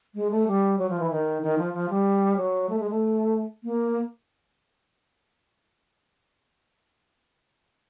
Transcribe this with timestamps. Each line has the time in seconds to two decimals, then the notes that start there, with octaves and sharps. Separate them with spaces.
0.15 G#3
0.31 A3
0.47 G3
0.78 F#3
0.89 F3
1.00 E3
1.10 D#3
1.42 D#3
1.58 F3
1.74 F3
1.90 G3
2.37 F#3
2.69 A3
2.79 G#3
2.90 A3
3.64 A#3